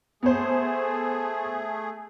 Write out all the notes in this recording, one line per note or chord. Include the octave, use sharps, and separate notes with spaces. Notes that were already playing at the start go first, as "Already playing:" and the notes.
A3 B3 G#4 C5